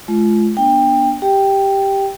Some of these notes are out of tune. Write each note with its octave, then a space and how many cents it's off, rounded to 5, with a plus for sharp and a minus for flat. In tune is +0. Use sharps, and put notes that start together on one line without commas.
G#3 +45 F4 -20
B3 -35 D4 -5 G5 +20
G4 +0 G5 +0